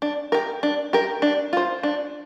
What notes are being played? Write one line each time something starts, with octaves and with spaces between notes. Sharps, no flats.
D4
G4 A#4
D4
G4 A#4
D4
F4 C5
D4